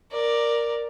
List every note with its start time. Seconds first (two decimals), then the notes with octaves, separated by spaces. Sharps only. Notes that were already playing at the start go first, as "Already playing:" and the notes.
0.11 A#4 D5